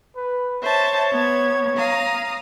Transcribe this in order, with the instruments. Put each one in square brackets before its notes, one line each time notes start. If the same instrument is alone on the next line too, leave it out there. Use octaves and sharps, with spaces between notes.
[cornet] B4
[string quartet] C5 E5 A5 [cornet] C#5
[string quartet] B3 G#6
F5 A#5 D#6